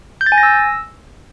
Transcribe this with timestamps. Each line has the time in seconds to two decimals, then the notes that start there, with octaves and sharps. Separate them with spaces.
0.21 G6
0.26 A6
0.32 G#5
0.38 A#6
0.43 E6